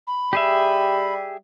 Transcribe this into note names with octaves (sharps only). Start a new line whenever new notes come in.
B5
G3 G4 G#4 E5